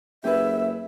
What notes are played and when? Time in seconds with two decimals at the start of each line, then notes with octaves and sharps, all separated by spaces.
0.24 F#1 G4 G#4 B4 E5